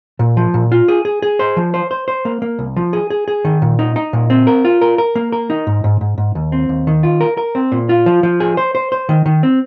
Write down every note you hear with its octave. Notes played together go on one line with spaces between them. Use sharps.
A#2
F3
A#2
F4
G#4
G#4
G#4
C5
F3
C5
C5
C5
A#3
A#3
C2
F3
G#4
G#4
G#4
D#3
A#2
D#4
D#4
A#2
C4
A#4
F4
A#4
A#4
A#3
A#4
D#4
G#2
G#2
G#2
G#2
D#2
C4
D#2
D#3
F4
A#4
A#4
C4
A#2
F4
F3
F3
G#4
C5
C5
C5
D#3
D#3
C4